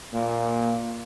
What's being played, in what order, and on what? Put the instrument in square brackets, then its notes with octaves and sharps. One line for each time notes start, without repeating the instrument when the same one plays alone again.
[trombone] A#2 [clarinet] A#3